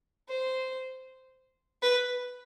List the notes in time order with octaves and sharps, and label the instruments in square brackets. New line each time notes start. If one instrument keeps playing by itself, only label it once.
[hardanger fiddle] C5
B4